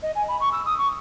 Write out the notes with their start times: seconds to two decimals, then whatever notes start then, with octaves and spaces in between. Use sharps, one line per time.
0.03 D#5
0.15 G#5
0.28 B5
0.40 C#6
0.52 E6
0.66 D#6
0.78 C#6